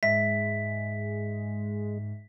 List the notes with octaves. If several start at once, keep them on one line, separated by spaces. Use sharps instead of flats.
G#2 G#3 E5 B6